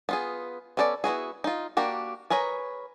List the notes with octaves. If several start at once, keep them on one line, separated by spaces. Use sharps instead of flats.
B3 F4 G#4
B3 C#4 A4 B4 D5
B3 E4 F#4 G#4
D#4 F4
A#3 D4 F#4 G4
G#4 A#4 B4 C#5 A#5